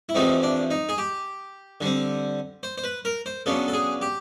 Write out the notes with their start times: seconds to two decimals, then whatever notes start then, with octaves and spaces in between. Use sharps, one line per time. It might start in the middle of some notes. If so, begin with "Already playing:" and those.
0.09 E4
0.15 E2 C3 F3 A3 C4 D#4
0.43 D4
0.71 D#4
0.89 G#4
0.98 G4
1.81 D3 G3 C4
2.63 C5
2.78 C5
2.84 B4
3.05 A#4
3.26 C5
3.46 C#3 F#3 B3 D4 A4
3.68 A4
3.73 G#4
4.02 G4